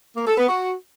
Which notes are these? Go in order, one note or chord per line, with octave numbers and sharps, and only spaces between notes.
A#3
A4
B3
F#4